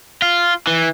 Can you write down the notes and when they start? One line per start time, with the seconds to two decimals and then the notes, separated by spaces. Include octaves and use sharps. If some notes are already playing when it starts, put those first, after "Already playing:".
0.22 F4
0.67 E3